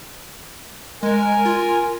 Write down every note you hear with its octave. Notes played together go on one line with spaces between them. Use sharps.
G#3 A#4 G#5
F4